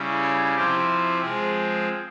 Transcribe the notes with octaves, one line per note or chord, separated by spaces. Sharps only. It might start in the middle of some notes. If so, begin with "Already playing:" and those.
Already playing: C#3 G3 C#4 E4
C#5
C3 F3 C4 E4 G4
F3 G#3 C4 G#4